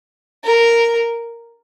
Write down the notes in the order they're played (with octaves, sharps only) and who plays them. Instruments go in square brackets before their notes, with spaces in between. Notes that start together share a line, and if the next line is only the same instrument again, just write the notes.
[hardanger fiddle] A#4